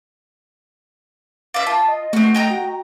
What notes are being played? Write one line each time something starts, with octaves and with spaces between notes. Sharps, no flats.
D5 E5 F5
F4 A5
D#5
A3 C4 F#4
D#5 G5 A#5
F#4